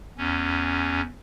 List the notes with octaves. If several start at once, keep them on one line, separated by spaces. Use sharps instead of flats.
E2 C#4